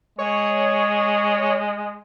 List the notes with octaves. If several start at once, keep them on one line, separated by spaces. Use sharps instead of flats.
G#3 C#5